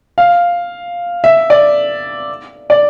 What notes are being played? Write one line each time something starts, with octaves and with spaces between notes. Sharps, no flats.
F5
E5
D5
D5